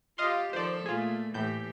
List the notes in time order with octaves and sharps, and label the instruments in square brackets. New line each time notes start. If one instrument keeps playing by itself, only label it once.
[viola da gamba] F4 G4 [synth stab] D#5 F5 C6
[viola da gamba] D#3 F3 A4 [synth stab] C5 D5
[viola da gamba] A#2 A3 [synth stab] F4 G#4
[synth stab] A2 G6 [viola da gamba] E3 G4